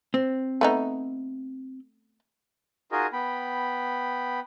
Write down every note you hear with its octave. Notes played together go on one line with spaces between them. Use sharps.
C4
A3 B3 D#4
D#4 F4 F#4 G#4 A#4 D#5
B3 G5 B5